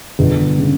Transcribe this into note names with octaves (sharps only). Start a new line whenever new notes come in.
G1
C#3